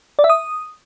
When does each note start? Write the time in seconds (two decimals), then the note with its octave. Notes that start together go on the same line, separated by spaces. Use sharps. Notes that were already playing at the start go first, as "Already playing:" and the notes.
0.19 D5
0.24 E5
0.30 D#6